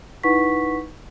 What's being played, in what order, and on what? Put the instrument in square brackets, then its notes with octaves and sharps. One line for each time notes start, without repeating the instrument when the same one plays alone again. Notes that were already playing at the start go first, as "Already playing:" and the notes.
[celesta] D#4 E4 B4 F#5 C#6 B6